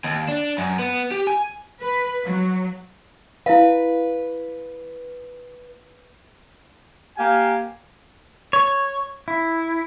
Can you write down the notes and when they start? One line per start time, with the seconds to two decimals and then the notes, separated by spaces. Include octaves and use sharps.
0.04 D#2
0.28 D4
0.58 F#2
0.79 B3
1.11 G4
1.27 G#5
1.82 B4
2.24 F#3
3.46 E4 B4 E5 F5
7.18 A#3 G4 F5 G5 G#5
8.53 C#5
9.28 E4